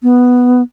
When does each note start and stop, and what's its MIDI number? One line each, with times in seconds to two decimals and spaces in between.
0.03 0.62 59